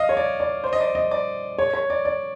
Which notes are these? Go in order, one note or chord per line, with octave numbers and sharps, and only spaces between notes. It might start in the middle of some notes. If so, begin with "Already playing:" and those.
Already playing: D#5 F5
C#5
D5
D5
C5
D#5
D5
D#5
D5
C#5
C#5
D5
D5